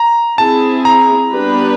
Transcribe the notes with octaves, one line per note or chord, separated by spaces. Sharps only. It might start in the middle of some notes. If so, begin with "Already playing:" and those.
Already playing: A#5
C4 E4 G#4 A5
A#5
G3 B3 D4 G4 B4